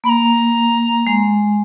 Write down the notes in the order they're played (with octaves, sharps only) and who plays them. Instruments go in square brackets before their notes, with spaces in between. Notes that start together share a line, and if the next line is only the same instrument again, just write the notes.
[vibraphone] A#3 [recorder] B5
[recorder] A#5
[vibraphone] G#3